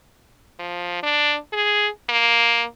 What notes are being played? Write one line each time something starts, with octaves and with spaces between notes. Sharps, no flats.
F3
D4
G#4
A#3